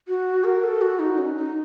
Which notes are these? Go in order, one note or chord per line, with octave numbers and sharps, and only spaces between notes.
F#4
A#4
A4
F#4
D#4
C#4
D#4